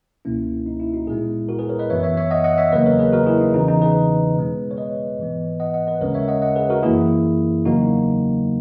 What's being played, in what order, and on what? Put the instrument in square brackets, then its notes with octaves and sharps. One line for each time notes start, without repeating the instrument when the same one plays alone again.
[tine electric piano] C#2 B2 A#3 C#4 E4
D#4
E4
D#4 F#4
A#2 G#3 B3 E4 G#4
F#4 A#4
G#4 B4
A#4 C#5
B4 D#5
F#2 E3 B3 C#5 E5
C#5 E5
C#5 E5
D#5 F#5
D#5 F#5
C#5 E5
E2 C#3 F#3 A#3 B4 D#5
A#4 C#5
G#4 B4
F#4 A#4
E4 G#4
D#4
E2 C#3 E3 D#4
D#4
G#4 B4
B2 G#3 B3
C#5
B4 D#5
G#2 E3 B3
D#5 F#5
D#5 F#5
B4 D#5
D#2 C#3 G#3 C#4 A#4 C#5
C#5 E5
D#5 F#5
D#5 F#5
G#4 B4
F#4 A#4
F#2 E3 A#3 E4 G#4
E2 C#3 F#3 A#3 D#4 F#4